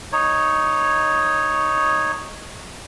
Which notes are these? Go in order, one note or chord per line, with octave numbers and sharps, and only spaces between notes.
D#4 C#5